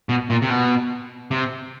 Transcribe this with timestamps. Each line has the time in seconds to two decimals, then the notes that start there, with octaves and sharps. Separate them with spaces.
0.09 B2
0.30 A#2
0.42 C3
0.50 B2
1.31 C3